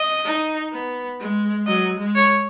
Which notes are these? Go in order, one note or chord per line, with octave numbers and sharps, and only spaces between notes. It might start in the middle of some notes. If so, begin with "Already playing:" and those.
Already playing: D#5
D#4
B3
G#3
F#3 D#5
G#3
C#5